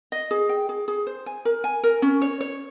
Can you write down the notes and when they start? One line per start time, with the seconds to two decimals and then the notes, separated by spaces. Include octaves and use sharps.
0.12 D#5
0.31 G#4
0.49 G5
0.69 G#4
0.88 G#4
1.07 C5
1.26 G#5
1.45 A#4
1.64 G#5
1.83 A#4
2.02 C#4
2.22 C#5
2.41 C#5